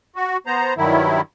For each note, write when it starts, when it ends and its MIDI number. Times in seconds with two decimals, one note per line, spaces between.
0.16 0.37 66
0.47 0.74 59
0.47 0.74 72
0.47 0.74 82
0.77 1.21 43
0.77 1.21 51
0.77 1.21 54
0.77 1.21 64